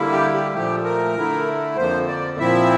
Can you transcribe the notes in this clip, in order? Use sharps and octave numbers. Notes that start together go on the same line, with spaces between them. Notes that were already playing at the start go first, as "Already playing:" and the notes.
Already playing: D3 G3 A#3 E4
G4
G4
A#2 F3 A3 G4
A#4
D3 A3 E4
F2 D3 F3 A#3 C5
D5
A#2 F3 C4 E4 E5